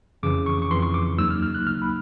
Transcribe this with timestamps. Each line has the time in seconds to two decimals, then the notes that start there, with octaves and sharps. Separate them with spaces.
0.23 F2 C#3 E3 D6
0.46 C#6
0.62 C#6
0.71 F2 C#3 E3 C6
0.82 C#6
0.94 D6
1.18 D#2 C#3 F#3 A#3 D#4 E6
1.30 F6
1.42 F6
1.54 F#6
1.66 D#2 C#3 F#3 A#3 D#4 F6
1.82 B5